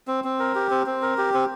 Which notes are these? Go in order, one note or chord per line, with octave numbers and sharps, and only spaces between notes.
C4
C4
A#4
G4
C4
C4
A#4
G4
C4